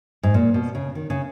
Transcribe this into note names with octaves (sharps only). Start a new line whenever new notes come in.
G#2
A#2
B2
C#3
D#3
C#3